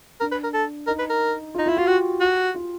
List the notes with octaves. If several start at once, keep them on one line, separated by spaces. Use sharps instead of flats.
D4 A#4
B4
A#4
A4
D#4 A#4
B4
A#4
F4
D#4
F4
E4
F4 F#4
F#4 G4
F#4
F4